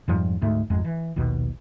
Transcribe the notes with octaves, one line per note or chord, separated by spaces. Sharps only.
F2 G#2 F3 G3
D2 G#2 A3
G#1 F2 G#3
E3
A#1 D#2 B2